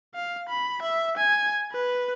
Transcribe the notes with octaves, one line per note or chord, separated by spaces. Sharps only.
F5
B5
E5
G#5
B4